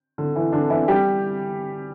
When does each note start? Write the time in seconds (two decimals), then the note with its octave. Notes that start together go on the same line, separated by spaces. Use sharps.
0.18 D3
0.36 E3
0.52 D3 D4
0.70 E3 E4
0.88 G3 G4